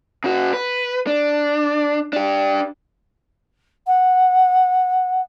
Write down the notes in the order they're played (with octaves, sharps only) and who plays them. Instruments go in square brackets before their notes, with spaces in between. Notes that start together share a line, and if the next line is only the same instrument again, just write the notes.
[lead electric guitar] C#3 F#4
B4
D4
D4 G4
[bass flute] F#5